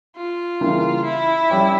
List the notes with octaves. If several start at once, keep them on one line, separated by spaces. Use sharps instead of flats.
F4
C#3 E3 G3 A#3 E4
E4
G3 C#4 G4 C#5